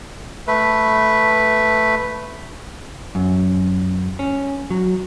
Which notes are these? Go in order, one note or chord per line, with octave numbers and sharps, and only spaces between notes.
A3 B4
F#2
C#4
F#3